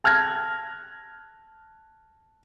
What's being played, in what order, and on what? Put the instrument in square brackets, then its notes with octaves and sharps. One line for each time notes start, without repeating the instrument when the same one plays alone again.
[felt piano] A5 F6 F#6 G#6 A#6